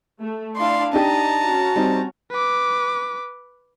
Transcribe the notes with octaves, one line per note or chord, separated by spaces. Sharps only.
A3
D4 E4 D5 F5 C6
D4 D#4 G4 D#5 A5 A#5
C#4 F#4
G3 C4 D#4
B4 D6